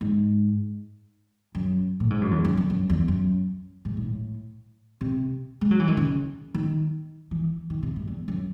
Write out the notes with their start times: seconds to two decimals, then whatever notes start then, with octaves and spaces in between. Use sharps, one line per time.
0.01 G#2
1.55 F#2
2.00 A2
2.10 G#2
2.21 F#2
2.31 E2
2.45 F#2
2.57 E2
2.70 F#2
2.90 E2
3.08 F#2
3.85 G#2
3.97 G#2
4.04 A2
5.01 C3
5.61 G#3
5.71 F#3
5.80 E3
5.88 D#3
5.97 C#3
6.54 D#3
7.31 E3
7.70 D#3
7.83 C3
7.96 G#2
8.07 E2
8.28 F#2